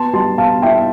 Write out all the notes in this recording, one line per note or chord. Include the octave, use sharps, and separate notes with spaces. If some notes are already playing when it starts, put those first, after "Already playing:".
Already playing: B3 A5 C6
G3 A5 C6
B2 F5 A5
E4 E5 G5